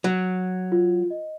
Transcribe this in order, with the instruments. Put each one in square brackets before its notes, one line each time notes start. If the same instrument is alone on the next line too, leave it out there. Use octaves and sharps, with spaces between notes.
[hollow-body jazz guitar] F#3
[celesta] F4
D#5